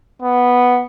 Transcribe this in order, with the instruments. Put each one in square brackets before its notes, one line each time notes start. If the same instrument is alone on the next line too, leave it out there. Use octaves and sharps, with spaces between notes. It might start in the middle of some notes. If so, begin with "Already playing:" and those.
[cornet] B3